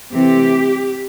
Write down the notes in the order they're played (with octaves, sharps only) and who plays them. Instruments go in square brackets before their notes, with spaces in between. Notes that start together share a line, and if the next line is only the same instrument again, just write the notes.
[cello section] C3 E3 A3 C4 G4